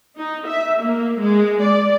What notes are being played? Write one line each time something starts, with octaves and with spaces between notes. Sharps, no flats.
D#4
E5
A#3
G#3
D5